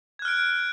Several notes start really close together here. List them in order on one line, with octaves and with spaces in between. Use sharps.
G#6 F#6 F6 D7